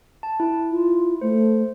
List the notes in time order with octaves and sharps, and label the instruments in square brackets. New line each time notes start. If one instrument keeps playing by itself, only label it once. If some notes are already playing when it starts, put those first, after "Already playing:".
[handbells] A5
E4
[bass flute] F4
[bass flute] A3 [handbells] C5